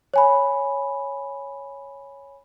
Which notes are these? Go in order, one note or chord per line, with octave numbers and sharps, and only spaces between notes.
C#5 G#5 B5